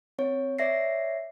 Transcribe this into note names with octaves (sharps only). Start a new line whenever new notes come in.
C4 C#5
C#5 D5 E5 A#6 C7